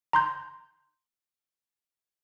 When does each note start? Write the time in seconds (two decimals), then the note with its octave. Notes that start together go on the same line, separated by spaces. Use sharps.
0.13 A#5 C6 G6